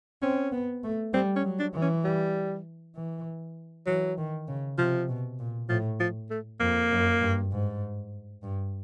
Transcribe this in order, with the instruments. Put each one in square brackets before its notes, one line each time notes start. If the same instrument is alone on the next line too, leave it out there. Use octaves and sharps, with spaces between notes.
[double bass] C4 [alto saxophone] C#4
[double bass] B3
A3
[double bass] G3 [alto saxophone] C4
[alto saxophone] C#4
[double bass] F#3
[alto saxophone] D4
[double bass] E3
[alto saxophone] C#4
G3
[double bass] E3
[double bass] E3 [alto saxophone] F#3
[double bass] D#3
C#3
[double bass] C3 [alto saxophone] F3
[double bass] B2
A#2
[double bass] A2 [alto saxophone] F3
[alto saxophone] F3
A3
[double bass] F2 [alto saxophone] A#3
[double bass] F#2
G2
G#2
G2